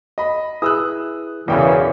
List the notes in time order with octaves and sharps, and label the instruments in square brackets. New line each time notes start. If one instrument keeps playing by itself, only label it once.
[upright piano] D#5 B5
[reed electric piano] E4 G#4 B4 [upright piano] D#6 E6 F#6
[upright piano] E1 G5 [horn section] C#3 [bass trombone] E3 [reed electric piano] A#4 B4 D5